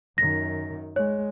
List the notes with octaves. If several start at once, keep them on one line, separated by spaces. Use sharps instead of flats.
F#2 D#3 A#6
G#3 C#5